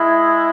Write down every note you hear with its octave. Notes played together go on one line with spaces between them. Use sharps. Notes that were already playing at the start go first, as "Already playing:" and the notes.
Already playing: G#3 E4